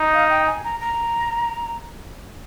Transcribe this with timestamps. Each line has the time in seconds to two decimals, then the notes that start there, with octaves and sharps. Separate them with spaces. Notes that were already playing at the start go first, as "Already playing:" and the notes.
Already playing: D#4
0.13 F5
0.30 G5
0.47 G#5
0.64 A#5
0.80 A#5